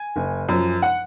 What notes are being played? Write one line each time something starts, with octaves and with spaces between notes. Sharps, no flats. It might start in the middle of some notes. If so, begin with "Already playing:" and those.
Already playing: G#5
F#1
F#2 F3
F#5